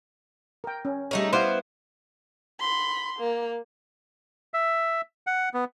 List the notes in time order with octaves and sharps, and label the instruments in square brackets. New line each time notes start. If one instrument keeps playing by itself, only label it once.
[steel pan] A#4 G5
C#4
[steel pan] G3 C#5 [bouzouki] A3 D#4 G#4
[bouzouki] B3 E4 C5 [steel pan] D5 D#5 F5
[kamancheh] B5 C6
A#3
[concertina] E5
F#5
B3